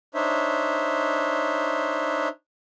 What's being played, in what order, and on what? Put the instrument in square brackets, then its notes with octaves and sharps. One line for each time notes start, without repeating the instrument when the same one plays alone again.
[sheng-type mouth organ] D4 D#4 C5 C#5 E5